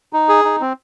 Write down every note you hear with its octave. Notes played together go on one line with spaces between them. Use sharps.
D#4
G#4
D#4
C4